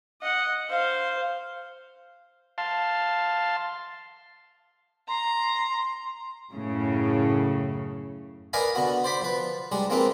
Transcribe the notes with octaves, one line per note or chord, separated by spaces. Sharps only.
D#5 F#5
C5 F5
F5 A5 C6
A#5 C6
F#2 A2 C#3
A#4 B4 D5 D#5 F5 G#5
D3 B3 F#4
C5 D5 B5
F3 B4
G3 G#3 D4
F3 G#3 A#3 C4 D#4 B4